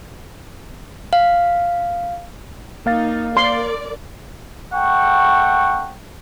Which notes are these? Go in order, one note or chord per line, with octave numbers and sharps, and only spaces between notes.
F5
A#3 D#4 F5 A6
A#4 D5 C6
A3 F#5 G5 C#6